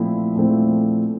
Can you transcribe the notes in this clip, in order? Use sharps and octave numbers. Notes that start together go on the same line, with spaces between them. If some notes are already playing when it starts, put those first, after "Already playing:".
Already playing: A#2 F3 A3 C4 E4
A#2 F3 A3 C4 E4